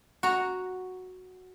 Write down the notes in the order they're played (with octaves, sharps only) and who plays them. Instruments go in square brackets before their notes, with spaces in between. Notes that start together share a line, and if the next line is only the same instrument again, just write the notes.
[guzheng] F#4 A#5